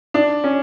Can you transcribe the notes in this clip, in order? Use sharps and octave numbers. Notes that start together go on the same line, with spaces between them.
D4
C#4